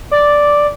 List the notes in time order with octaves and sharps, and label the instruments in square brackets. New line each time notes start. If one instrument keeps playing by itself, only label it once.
[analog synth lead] D5